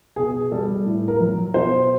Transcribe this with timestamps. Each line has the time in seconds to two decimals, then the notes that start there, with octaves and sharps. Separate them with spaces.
0.16 B2 G#4
0.51 G3 A4
0.86 A2
1.08 A#4
1.20 F#3
1.54 B2 C5